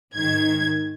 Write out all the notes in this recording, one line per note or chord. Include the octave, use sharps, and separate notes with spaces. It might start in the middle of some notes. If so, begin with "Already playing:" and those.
G#2 D#3 G#6